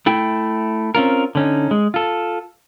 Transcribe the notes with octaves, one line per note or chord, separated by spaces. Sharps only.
A3 E4 G5
C4 C#4 F4 A#4
D3 C#4 D#4
G#3
F4 A4